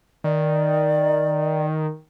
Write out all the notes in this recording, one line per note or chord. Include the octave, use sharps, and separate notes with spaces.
D#3 D5